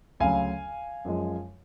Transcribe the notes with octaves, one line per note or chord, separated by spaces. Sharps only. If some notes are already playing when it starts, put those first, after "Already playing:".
D2 C#3 F#3 F5 G#5
F#2 F3 G#3